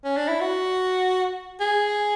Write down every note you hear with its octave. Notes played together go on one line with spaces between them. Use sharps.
C#4
D4
E4
F#4
G#4